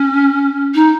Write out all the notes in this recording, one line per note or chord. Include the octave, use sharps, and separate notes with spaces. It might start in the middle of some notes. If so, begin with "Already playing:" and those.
Already playing: C#4
D#4